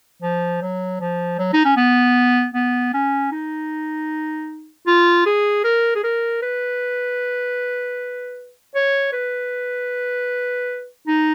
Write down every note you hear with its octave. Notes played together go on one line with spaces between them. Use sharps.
F3
F#3
F3
F#3
D#4
C#4
B3
B3
C#4
D#4
F4
G#4
A#4
G#4
A#4
B4
C#5
B4
D#4